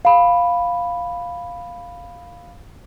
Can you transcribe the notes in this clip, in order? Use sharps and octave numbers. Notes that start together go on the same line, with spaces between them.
F5 B5